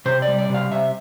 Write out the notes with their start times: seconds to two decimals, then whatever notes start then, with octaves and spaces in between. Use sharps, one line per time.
0.06 C3 C5
0.22 D5
0.28 G3
0.39 D5
0.49 C3
0.54 F5
0.71 C3 E5